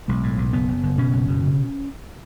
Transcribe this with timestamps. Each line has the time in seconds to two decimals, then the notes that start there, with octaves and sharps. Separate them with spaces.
0.08 B1 G#3
0.23 A2
0.38 B1
0.53 F#1 B3
0.68 F#1
0.83 F#1
0.98 B2 C#4
1.13 F#1
1.28 B2
1.43 C#3